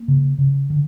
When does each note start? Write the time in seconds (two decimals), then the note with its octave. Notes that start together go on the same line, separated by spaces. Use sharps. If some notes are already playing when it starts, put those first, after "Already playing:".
Already playing: A#3
0.08 C#3
0.38 C#3
0.70 D3